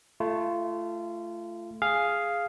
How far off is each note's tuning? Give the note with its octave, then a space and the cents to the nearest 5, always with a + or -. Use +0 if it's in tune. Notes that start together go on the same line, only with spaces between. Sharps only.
A3 +0 F4 -25
G#4 +0 F5 +0